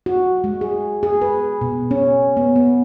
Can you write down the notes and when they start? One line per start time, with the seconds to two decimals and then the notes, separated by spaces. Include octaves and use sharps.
0.06 F#4
0.44 G#3
0.61 G#4
1.03 G#4
1.22 B4
1.61 B2
1.91 C#4
2.37 B3
2.56 B3